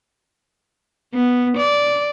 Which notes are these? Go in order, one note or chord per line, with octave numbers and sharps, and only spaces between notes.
B3
D5